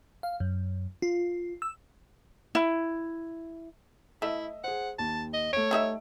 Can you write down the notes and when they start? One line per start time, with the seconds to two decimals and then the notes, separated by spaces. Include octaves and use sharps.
0.23 F5
0.40 F#2
1.02 F4
1.62 E6
2.55 E4
4.22 A3 E4 D#5 E5
4.64 G#4 C5 F#5
4.99 D#2 A5
5.34 D#5
5.53 A3 C#5 D7
5.71 G3 D#4 E5